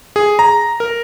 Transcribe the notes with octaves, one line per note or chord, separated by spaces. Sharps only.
G#4
A#5
A#4